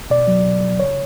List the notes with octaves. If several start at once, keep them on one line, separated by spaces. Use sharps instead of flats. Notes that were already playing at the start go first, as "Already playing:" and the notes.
B2 D5
F#3
B2
F#3
C#3 C#5